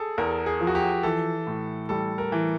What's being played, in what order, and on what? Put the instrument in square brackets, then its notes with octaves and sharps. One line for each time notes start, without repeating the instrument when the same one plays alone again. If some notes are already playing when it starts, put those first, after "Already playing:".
Already playing: [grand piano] G#4 A4
[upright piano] E2 [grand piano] A#4
[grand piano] G#4
[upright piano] F3
[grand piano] F#4
G4
[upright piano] E3 [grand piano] A4
[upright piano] A2
[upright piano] G3 [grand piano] A4
[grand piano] A#4
[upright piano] E3